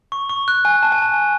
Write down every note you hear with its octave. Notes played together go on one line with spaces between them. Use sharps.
C#6
C#6
F#6
G#5
A5
G#5
A5